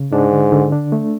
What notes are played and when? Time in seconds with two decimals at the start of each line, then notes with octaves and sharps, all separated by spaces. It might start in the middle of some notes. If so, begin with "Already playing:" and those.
Already playing: C#3
0.12 G#2 D4
0.32 D3
0.52 D3
0.72 D4
0.92 A3